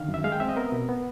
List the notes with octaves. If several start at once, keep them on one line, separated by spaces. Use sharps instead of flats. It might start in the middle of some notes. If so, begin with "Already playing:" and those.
Already playing: D3 D#3 F5
F#2
E5
G#3 F5
G5
C4 E5
D#5
B3 A#4
B2
B3